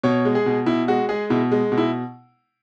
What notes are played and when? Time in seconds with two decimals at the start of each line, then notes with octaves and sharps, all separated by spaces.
0.03 B2 C#5
0.25 G#3
0.35 G#4
0.46 B2
0.66 B2 E4
0.88 G#3 F#4
1.09 G#3 G#4
1.30 B2 E4
1.52 G#3
1.72 B2
1.78 E4